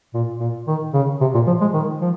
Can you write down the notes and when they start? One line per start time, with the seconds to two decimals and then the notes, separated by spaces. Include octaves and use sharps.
0.14 A#2
0.40 A#2
0.68 D#3
0.94 C#3
1.21 C3
1.34 A#2
1.47 F3
1.61 G#3
1.74 D#3
2.01 F3